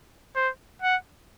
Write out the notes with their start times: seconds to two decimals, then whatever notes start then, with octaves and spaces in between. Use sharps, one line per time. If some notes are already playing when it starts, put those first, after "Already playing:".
0.36 C5
0.82 F#5